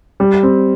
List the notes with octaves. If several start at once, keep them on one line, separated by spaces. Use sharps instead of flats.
G3
C4